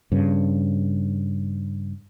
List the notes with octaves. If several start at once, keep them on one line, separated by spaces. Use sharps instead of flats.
G2 C#3